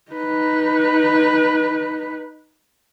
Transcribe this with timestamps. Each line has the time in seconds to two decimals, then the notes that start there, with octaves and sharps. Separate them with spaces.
0.12 D#4 B4